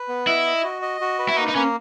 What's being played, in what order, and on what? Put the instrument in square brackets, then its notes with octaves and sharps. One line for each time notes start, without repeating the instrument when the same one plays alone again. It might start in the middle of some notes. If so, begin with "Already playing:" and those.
Already playing: [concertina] B4
B3
[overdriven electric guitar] E4 [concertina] D#5
[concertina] D#5
F#4
D#5
F#4
B4
[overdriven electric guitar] E4
[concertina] A#3 [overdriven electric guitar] D#4
[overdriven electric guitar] D#4
[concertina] A#3 [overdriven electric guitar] C#4